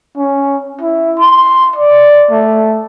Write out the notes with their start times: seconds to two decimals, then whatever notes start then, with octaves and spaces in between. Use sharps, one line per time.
0.17 C#4
0.81 E4
1.18 C6
1.76 D5
2.30 A3